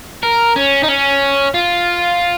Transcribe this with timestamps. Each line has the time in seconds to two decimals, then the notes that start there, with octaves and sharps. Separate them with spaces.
0.23 A#4
0.56 C#4
0.83 D#4
0.88 C#4
1.54 F4